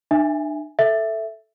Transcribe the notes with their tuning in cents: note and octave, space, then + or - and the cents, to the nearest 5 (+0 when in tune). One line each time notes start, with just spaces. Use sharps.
D4 +40 E5 +0 G#5 +0
A4 +0 E5 +0